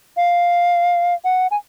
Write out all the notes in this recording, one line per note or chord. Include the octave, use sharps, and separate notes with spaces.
F5
F#5
G#5